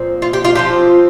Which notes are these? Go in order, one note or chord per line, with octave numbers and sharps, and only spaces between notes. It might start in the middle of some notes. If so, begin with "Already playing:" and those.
Already playing: A#2 F3 C4
F4
G4
F4
F3 C4 F4 G4